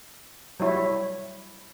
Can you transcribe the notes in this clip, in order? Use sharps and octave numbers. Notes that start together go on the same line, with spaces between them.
F#3 G3 E4 C#5